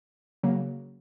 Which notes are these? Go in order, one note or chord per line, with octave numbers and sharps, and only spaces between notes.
C#3 F#3 A#3